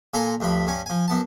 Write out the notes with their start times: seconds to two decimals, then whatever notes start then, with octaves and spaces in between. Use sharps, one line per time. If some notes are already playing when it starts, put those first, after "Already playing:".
0.14 A#2 A4 G#5 A#5 C6
0.40 D2 G2 F3 B5
0.67 G2 C#4 G#5
0.86 F3 G#5
1.08 F#2 B3 A5